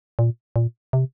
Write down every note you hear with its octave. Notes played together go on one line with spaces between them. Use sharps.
A#2
A#2
C3